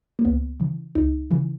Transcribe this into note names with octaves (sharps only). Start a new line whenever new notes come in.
A#3
C#2 B3
C#3 E3
C#2 D#4
C#3 E3